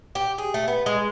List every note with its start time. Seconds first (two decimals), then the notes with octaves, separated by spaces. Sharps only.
0.15 G4
0.38 G#4
0.54 A3
0.68 B3
0.86 G#3